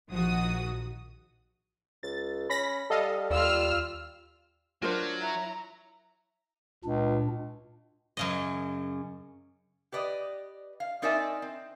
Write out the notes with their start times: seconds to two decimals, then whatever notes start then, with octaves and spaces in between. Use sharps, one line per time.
0.11 A#1 D#3 F3 F#4 D#6
2.03 C#2 A6
2.50 C#4 B5 A#6 B6
2.90 G3 A4 D#5 F5
3.30 D#2 G3 F4 E6 F6
4.82 F#3 D4 F4 A#4 C5
5.20 E4 A#5
6.84 C#2 A#2 D4
8.17 F#2 C#3 D#5
9.92 G4 B4 D5 D#5
10.80 F5
11.02 C4 D#4 A#4 D5 E5 G#5
11.42 C4